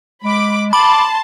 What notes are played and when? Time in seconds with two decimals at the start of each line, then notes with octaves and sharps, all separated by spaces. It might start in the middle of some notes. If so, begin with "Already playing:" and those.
0.24 G#3 B5 D6
0.73 A5 B5 C6 D6